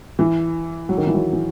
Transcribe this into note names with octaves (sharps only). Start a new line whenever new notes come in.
E3
F#3
D#3
E3
F#3
E3